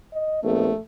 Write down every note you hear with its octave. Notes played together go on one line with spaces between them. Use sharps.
D#5
A#1 A3 B3